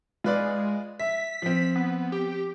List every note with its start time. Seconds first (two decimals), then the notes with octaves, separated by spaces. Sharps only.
0.24 G#3 F4 B4 D5
0.99 E5 B6
1.42 F3 C4
1.76 B3
2.12 G4